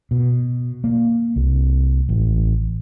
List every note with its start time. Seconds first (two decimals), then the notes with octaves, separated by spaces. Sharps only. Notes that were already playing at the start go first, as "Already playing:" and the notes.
0.11 B2
0.84 A#3
1.36 C2
2.09 A1